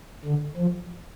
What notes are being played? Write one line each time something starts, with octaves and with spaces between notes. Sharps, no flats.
D3
F3